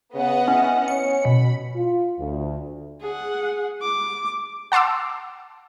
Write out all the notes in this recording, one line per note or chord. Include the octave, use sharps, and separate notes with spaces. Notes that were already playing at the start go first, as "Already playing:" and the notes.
C#3 B3 D#5 F#5
C#4 E4
C#4 C#7
B2 B5
F4
D2
G#4 F#5
D6
F#5 A5 C6 D6 E6